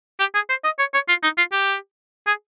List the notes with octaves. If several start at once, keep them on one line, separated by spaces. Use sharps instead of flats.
G4
G#4
C5
D#5
C#5
C#5
F4
D#4
F4
G4
G#4